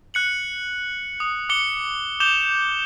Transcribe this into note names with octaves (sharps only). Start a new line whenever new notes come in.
F#6 C#7 F#7
D#6
D6 D#6 C#7 G7
D6 G6 E7 F7 G7